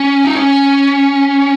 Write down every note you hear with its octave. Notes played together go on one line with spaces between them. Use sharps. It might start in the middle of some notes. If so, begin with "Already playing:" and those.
Already playing: C#4
D#4
C#4